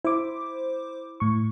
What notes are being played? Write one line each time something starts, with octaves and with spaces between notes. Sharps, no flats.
E4 C5 D6
A2 C#6